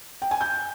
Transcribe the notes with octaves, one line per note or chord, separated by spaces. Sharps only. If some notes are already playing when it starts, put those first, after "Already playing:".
G5
G#5
G6